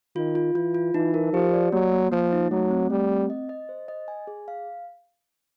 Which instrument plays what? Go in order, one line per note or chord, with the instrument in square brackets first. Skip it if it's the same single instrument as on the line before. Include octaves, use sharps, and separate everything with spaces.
[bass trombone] D#3 [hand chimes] F4
[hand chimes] F4
[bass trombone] E3 [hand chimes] F4
[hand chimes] F4
[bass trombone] E3 [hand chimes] D#4
[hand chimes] A#4
[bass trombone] F3 [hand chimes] G4
[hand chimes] D5
[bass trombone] F#3 [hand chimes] A#3
[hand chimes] A#3
[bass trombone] F3 [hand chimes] A#3
[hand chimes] D#4
[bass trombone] F#3 [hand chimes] A3
[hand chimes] C4
[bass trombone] G3 [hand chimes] A3
[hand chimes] C4
D#5
D#5
C5
D#5
G#5
G#4
F5